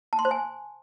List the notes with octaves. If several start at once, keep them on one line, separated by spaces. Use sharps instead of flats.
A5
C6
C5
G#5